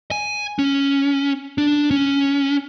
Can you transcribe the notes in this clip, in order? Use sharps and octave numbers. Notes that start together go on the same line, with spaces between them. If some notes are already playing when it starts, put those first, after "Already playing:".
G#5
C#4
D4
C#4